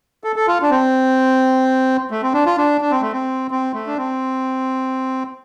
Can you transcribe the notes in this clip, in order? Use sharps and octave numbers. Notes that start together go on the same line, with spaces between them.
A4
A4
F4
D4
C4
A3
C4
D4
F4
D4
D4
C4
A3
C4
C4
A3
D4
C4